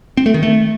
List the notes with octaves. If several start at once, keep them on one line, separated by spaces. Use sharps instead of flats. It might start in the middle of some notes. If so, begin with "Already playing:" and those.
C4
A3
D#3
A3